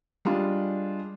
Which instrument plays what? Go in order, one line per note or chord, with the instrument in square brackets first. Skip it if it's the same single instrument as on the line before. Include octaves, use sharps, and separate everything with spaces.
[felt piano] G3 G#3 D4 F4